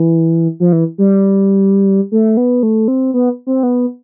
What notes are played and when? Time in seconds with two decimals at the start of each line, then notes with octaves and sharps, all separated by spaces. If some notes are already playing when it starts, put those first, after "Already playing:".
Already playing: E3
0.60 F3
0.73 E3
0.98 G3
2.12 A3
2.37 B3
2.63 A3
2.88 C4
3.14 B3
3.47 C4
3.63 B3